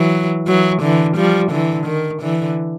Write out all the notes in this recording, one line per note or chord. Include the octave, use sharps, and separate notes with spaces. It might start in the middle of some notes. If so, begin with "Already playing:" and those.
Already playing: E3 F#3
E3 F#3
D3 E3
F3 G3
D3 E3
D#3
D3 E3